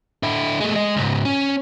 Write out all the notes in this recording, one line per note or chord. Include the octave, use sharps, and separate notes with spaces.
D3 E4
G#3 A3
G#3 D#5
C#2 G#2
C#4